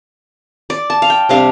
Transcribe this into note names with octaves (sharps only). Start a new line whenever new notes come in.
D5
A5
F5
G5
C3 G3 D4 F5